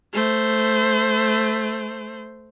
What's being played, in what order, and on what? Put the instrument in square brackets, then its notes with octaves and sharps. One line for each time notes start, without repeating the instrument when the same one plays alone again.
[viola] A3 C5